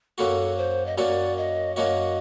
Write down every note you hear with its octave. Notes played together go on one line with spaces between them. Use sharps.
F#2 F#3 A#3 F#4 A4
C5
D#5
F#2 F#3 A#3 F#4 D5
D#5
F#2 F#3 A#3 F#4 D#5